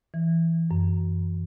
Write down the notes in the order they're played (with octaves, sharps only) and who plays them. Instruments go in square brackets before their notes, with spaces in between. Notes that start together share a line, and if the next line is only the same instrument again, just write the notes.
[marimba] E3
F#2